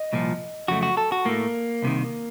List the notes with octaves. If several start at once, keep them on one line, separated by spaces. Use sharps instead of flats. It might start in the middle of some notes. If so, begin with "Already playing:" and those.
Already playing: D#5
C2 A#2 F3
F2 C#3 F#3 A3 F#4
F#4
A4
F#4
A2 A3 A#3
C2 C3 D#3